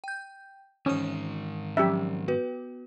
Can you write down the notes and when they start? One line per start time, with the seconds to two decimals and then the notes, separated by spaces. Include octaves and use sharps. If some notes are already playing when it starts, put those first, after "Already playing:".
0.04 G5 G6
0.86 G#2 D#3 E3 C#4 D#6
1.77 F3 F#3 C#4 G4 E5
2.28 B3 F#4 B4